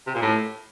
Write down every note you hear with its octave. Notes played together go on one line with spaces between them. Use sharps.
C3
A#2
A2